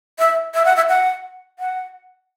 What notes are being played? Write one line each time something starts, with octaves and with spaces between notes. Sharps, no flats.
E5
E5
F#5
E5
F#5
F#5